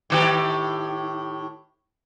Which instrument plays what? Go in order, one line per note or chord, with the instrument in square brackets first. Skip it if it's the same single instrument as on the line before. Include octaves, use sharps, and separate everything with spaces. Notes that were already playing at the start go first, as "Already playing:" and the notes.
[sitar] A2 D#3 G4